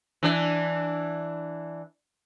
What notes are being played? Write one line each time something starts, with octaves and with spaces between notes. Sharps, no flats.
E3 D4